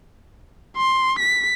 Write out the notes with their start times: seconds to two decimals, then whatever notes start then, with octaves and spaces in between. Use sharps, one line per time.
0.77 C6
1.19 B6